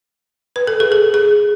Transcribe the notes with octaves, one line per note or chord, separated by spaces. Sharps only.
B4
A4
G#4
A4
G#4